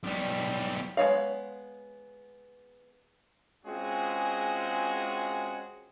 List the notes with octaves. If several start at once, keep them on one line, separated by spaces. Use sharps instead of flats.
B1 G3
G#3 B3 C#5 D5 F5
G#3 C4 C#4 F4 F#4 G#4